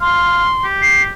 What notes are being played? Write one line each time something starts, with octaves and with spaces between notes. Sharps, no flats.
F5 C6
G4
C7